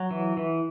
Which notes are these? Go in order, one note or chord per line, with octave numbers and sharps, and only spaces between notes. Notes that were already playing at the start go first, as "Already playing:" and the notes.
Already playing: F#3
E3
E3